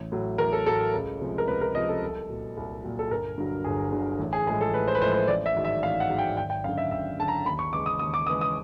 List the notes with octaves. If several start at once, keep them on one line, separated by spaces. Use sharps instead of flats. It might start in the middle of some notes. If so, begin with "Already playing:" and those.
Already playing: A1
A2 F#3
A1 A#4
A4
A2 F#3 A4
C#2
C3 F3 G#3
A#4
C#2 B4
A#4
C3 F3 G#3 D#5
A4
C2
A#2 F#3
C2
A#2 F#3
A4
G1 A#4
G2 D3 F#3
G1 G#4
G2 D3 F#3
A1
G#4
A2 F3 G#3 G#4
A4
A1 B4
C5
B4
A2 F3 G#3 C5
C5
A1 D5
E5
G#2 D#3 F#3
E5
A1 F5
F#5
G#2 D#3 F#3
G5
G#1 G5
G5
F#2 D3 F5
E5
G#1 E5
F#2 D3 A5
A#5
D#2 B5
C#6
C#3 E3 G#3 D6
D#6
D#2 D#6
D6
C#3 E3 G#3 D#6
D#6